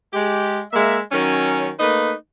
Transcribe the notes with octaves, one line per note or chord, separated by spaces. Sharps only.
G#3 G4
G#3 A#3 E5
D#3 F#3 C#4
A3 A#3 D#4 B4